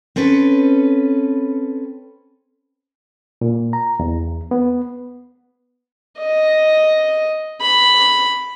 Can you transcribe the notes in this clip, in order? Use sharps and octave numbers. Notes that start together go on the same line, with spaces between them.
C4 C#4 A4 B4
A#2
A#5
E2
B3
D#5
B5